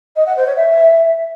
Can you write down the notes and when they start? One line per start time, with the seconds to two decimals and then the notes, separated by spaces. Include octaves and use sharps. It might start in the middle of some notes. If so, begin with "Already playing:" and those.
0.16 D#5
0.26 F#5
0.36 C5
0.46 C#5
0.56 E5